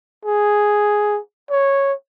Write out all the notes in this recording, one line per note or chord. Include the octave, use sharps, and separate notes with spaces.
G#4
C#5